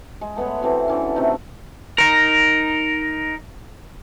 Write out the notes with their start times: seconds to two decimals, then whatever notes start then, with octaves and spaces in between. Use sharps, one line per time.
0.21 G#3
0.36 A3 B3 B4 C#5
0.61 E3 A3 C4 F#4
0.88 D3 E3 C#4
1.15 C3 A3 D#4
1.98 D#4 A#4